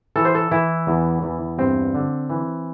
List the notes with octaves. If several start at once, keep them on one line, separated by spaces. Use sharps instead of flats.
E3 A4
C5
A4
E3 E4
E2
E2
G2 C4
D3
E3